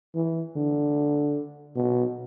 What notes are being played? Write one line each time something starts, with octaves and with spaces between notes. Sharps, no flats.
E3
D3
B2